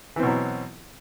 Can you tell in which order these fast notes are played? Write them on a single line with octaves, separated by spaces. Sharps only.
E3 C4 B2 F#3